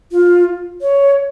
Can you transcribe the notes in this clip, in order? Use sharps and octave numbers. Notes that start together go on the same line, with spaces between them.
F4
C#5